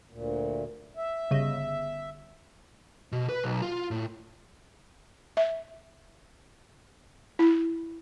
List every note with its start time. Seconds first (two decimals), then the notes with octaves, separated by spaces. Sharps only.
0.11 D2 A#2
0.96 E5
1.31 G1 C#3 D#5
3.12 B2
3.29 B4
3.44 B1
3.62 F4
3.91 A2
5.37 E5
7.39 E4